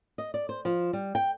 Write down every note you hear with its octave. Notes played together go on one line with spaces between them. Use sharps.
D#5
D5
C5
F3
G3
G5